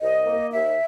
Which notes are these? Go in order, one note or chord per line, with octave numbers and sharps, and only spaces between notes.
C2 D#5
A#3
D#2 E5